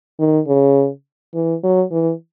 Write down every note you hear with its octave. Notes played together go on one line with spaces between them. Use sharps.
D#3
C#3
E3
F#3
E3